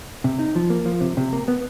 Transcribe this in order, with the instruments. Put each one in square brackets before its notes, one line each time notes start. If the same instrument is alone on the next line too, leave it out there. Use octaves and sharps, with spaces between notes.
[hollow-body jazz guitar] C3
D#4
F3
A#3
F3
C3
C3
A#3
B3